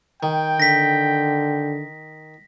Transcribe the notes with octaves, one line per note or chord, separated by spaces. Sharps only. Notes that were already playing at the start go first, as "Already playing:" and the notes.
D#3 G5
D3 A#6 B6